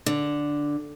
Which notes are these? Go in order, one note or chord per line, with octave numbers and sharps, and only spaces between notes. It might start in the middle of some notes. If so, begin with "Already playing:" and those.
D3